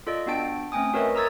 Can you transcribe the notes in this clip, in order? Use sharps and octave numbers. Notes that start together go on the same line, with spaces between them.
F4 A4 D5 D#5
B3 D4 F#4 G5 A5 D7
A3 C4 C#4 G5 G#5 D#6
F#4 A#4 B4 C#5 D#5 E5
A#4 A#5 D#6 E6 G#6 A6